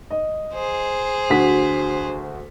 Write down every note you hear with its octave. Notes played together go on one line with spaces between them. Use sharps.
D#5
G#4 C5
D2 F#4 B6